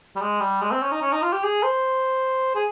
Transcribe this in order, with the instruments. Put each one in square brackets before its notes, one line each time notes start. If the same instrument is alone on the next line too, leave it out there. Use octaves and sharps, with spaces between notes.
[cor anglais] G3
G#3
G3
G#3
C4
C#4
D#4
C#4
D#4
F4
G4
G#4
C5
G#4